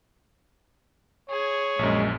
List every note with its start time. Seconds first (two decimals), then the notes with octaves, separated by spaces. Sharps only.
1.30 G#4 C#5
1.79 A#1 F#2 G#3